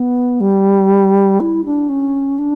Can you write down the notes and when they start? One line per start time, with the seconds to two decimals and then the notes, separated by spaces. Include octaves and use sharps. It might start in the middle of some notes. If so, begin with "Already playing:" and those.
Already playing: B3
0.40 G3
1.40 E4
1.64 D4
1.88 C#4
2.38 D4